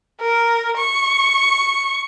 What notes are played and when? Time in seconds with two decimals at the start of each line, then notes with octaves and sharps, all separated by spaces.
0.21 A#4
0.77 C#6